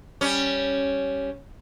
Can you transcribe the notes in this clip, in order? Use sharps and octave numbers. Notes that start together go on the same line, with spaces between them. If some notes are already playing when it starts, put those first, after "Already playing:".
G3 C#4